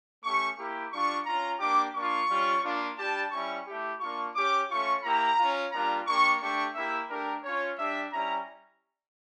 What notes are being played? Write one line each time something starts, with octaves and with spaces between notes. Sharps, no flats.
A3 C#4 G4 C#6
A#3 E4 G4
G3 D4 F4 C#6
C#4 F4 A#5
A#3 D4 G4 D6
A#3 D4 F4 C#6
G3 C#4 F4
A#3 D4 F4
G3 D4 G4 A5
G3 C#4 E4 C#6
A3 E4 G4
A#3 D4 F4 C#6
C#4 G4 D6
A3 C#4 F4 C#6
A#3 E4 G4 A#5
C#4 F4
G3 A#3 D4 F4 A#5
A#3 D4 G4 C#6
A3 D4 G4 C#6
A#3 E4 G4 E5
A3 D4 G4 A#4
C#4 F4 C#5
G3 D4 G4 E5
G3 C#4 E4 A#5